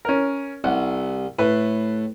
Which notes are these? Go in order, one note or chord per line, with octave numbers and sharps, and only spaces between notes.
C#4 A#4
C2 F#5
A2 B4